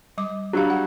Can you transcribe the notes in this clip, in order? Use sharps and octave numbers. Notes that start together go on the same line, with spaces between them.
G3 D6
F#3 G3 D4 G4 F5
F#5